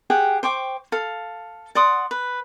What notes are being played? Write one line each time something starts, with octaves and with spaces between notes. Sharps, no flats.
G4 G#4 F#5 G5
C5 G5 C#6 D6
A4 F5
D5 F#5 C6 D#6
B4